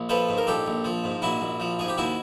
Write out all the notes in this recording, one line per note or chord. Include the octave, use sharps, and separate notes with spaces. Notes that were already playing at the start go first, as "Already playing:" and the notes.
Already playing: A#1
F3 A4 B4
G#2
A#4
A#1 G4 A4
A#1
F3
G#2
A#1 E4 F#4
A#1
F3
G#2 G#4
G4
D#2 E4 F#4